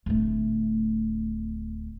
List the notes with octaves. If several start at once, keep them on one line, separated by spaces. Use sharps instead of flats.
D1 A3